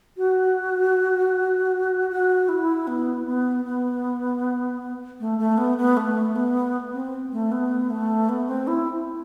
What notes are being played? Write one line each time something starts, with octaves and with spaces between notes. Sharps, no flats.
F#4
F#4
E4
B3
B3
B3
A3
A3
B3
B3
A3
B3
C4
A3
B3
A3
B3
C4
E4